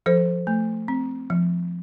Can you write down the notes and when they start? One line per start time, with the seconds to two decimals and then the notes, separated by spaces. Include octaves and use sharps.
0.06 F3 A4 C5
0.47 A3
0.88 C4
1.30 F3